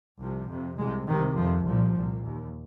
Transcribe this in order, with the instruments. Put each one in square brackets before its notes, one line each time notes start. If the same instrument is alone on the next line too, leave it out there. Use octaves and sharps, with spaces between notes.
[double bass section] C2 C3 F3
F2 C3
C2 D#3 G#3
C3
C2 C3 D#3
F2 C3 F3
C2 A#2 F3
C2 A#2
D#2